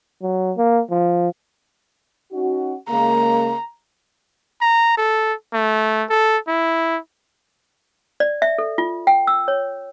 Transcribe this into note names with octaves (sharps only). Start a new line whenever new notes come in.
F#3
A#3
F3
C#4 D#4 F#4
C#3 G#3 A#3 A#5
A#5
A4
A3
A4
E4
D5
E5
A4
F4
G5
E6
C#5